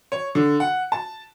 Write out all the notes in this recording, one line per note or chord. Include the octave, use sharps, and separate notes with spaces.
C#5
D3
F#5
A5